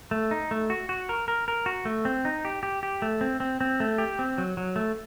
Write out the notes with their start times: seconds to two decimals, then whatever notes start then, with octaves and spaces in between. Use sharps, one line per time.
0.11 A3
0.31 D#4
0.51 A3
0.70 F#4
0.89 F#4
1.09 A#4
1.28 A#4
1.48 A#4
1.66 F#4
1.85 A3
2.05 C4
2.25 D#4
2.45 G4
2.63 G4
2.83 G4
3.02 A3
3.21 C4
3.40 C4
3.61 C4
3.80 A3
3.98 G4
4.19 C4
4.38 F#3
4.57 F#3
4.76 A3